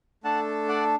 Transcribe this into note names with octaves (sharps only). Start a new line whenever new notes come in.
A3 D4 A4 F#5 A5
D5 F#5